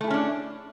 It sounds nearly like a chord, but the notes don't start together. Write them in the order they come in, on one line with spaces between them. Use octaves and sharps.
A3 E4 G#4 C#4 D4